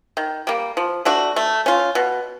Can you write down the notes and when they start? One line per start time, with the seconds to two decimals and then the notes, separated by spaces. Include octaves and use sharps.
0.17 D#3
0.47 G3 A#3
0.77 F3
1.05 A3 D4 F#4
1.36 A3
1.66 C#4 F4
1.95 B2